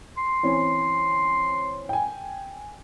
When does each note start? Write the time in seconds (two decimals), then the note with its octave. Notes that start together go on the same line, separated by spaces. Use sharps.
0.17 C6
0.43 E3 C4 C#4
1.89 G5 G#5